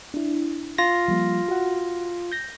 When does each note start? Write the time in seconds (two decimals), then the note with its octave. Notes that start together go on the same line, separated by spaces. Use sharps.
0.14 D4 E4
0.78 F4 A#6
1.08 F3 G3 A#3
1.49 F#4 F#5
2.32 G6 A#6